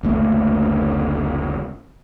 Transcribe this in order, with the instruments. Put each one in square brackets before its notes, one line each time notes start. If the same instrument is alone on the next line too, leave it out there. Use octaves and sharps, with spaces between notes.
[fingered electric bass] F#1 D2 A3 A#3